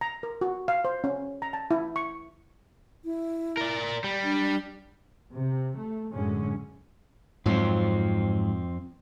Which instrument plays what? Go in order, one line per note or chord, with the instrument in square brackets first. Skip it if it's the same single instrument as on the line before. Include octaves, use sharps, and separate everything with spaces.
[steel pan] A#5
A#4
F#4
F5
C5
C#4
A#5
A5
E4
C#6
[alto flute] E4
[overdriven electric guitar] A#4 D5
G3
[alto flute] D4
[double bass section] C3
A3
F#2 A2 D3 G#3 C#4
[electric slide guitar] F2 F3 C4 [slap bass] G#2 F#3